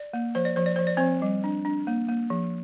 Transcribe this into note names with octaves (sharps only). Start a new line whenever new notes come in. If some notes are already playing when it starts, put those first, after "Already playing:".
Already playing: D5
A#3
F3 C5
D5
F3 C5
D5
F3 C5
D5
F3 C4 C5
G3
D4
D4
A#3
A#3
F3